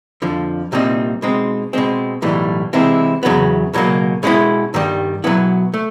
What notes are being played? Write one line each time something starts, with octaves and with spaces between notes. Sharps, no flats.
F2 D3 F3
C2 A#2 G3 C4 D#4
B2 G#3 C4 D#4
B2 G#3 C4
B1 A2 E3 G3
C3 E3 G#3 C4 E4
E2 C#3 F#3 B3
C#2 B2 F#3 A#3
B2 G#3 C#4 E4
G2 D#3 G3
B2 F#3 B3 E4
A3